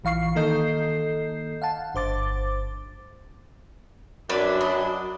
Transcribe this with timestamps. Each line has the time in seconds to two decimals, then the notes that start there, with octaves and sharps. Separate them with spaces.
0.04 A#1 E3 F5 C#6 C7
0.35 D#3 A#3 A4 D#5 G6 C7
1.62 F5 F#5 A5
1.95 G1 C5 D6 A6
4.30 F#2 F#3 D4 A#4 B4 D5
4.61 D#5 B5